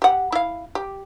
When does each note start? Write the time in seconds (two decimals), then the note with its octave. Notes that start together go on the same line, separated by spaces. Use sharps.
0.02 G4 F#5
0.32 E4 F5
0.75 G4